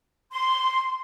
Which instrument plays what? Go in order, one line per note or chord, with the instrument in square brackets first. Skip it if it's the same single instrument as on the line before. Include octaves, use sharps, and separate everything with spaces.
[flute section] C6